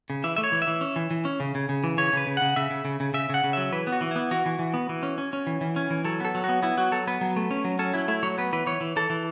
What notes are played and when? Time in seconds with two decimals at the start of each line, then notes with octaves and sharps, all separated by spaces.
0.10 C#3
0.24 E3 E5
0.36 A3 E5
0.44 C#5
0.52 E3
0.62 E5
0.67 E3
0.81 C#4
0.96 E3
1.11 E3
1.25 C#4
1.40 C#3
1.55 C#3
1.69 C#3
1.84 E3
1.98 C#3 C#5
2.13 C#3 B4
2.27 C#3
2.37 C#3 F#5
2.56 C#3 E5
2.70 C#3
2.85 C#3
3.00 C#3
3.14 C#3 E5
3.29 C#3 F#5
3.44 C#3
3.53 F#3 E5
3.72 E3 B4
3.87 B3
3.92 F#4
4.01 E3
4.11 B3 E4
4.31 E3 F#4
4.46 E3
4.59 E3
4.74 B3
4.89 E3
5.03 C#4
5.18 C#4
5.33 C#4
5.47 E3
5.61 E3
5.76 C#4
5.91 E3
6.04 F#3 A4
6.20 B3 A4
6.35 F#3
6.44 B3 F#4
6.63 B3 E4
6.77 F#3 F#4
6.92 F#3 A4
7.07 B3 B4
7.21 F#3
7.36 A3
7.51 C#4
7.64 F#3
7.79 C#4 A4
7.94 F#3 E4
8.08 A3 E4
8.23 F#3 C#5
8.38 B3 B4
8.53 E3 B4
8.66 E3 C#5
8.81 E3
8.96 E3 A4
9.10 E3